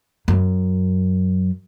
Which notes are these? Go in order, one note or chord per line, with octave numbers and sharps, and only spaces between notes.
F#2